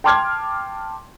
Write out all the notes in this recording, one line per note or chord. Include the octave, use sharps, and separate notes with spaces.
G5 A5 C6 D6 F6 G#6